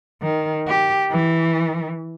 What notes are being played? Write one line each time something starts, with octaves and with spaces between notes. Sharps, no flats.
D#3
G4
E3